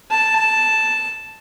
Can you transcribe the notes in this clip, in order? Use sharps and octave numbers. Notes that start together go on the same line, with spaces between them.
A5